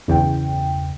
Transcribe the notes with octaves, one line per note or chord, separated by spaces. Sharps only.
G1 E2 C#3 G5